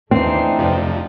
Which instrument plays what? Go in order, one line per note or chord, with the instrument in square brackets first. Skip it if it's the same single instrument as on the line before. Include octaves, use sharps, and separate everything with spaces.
[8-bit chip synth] D#2 C7 [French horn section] E3 [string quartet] A3 D4 D#4 [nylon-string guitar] C4
[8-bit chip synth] F2 C3 F3